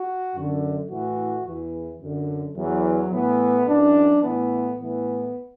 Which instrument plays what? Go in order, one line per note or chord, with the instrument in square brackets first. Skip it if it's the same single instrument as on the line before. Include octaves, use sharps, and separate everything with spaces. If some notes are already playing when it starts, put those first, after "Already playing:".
Already playing: [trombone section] F#4
F#2 D3
A2 E3 F#4
E2 E3
F#2 D3
E2 E3 F#3
A2 E3 B3
F#2 E3 D4
A2 E3 B3
A2 E3 B3